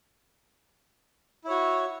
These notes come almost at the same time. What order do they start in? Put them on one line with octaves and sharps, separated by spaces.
E4 C#5 F#4